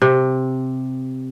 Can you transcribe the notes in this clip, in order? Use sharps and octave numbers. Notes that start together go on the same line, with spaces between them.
C3